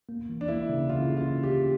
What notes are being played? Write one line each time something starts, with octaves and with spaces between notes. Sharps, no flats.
A#3
E3
D4
A#3 E4
C#3
C#3 F4
C#3
F4
C#3
G4
C#3